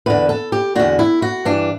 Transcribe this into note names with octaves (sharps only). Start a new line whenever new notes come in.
E2 D3 B4
A4
G4
E2 D3 F#4
E4
F#4
G2 E3 D4